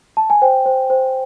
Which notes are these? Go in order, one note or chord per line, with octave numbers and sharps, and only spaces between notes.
A5
G#5
C5 G5
C5
C5